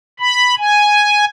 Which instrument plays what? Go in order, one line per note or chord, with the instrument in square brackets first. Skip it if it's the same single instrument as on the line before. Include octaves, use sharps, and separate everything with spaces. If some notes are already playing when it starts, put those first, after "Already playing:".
[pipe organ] B5
G#5